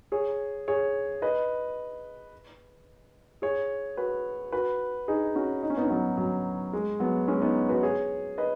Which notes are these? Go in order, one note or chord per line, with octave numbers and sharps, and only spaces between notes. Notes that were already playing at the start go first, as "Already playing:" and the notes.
G#4 C#5
G#4 C#5
B4 D#5
G#4 C#5
F#4 B4
F#4 B4
D#4 G#4
C#4 F#4
D#4
C#4
B3 D#4
C#4
F#3 B3
F#3
G#3
F#3 B3
G#3 C#4
B3 D#4
F#4 B4
G#4 C#5
B4 D#5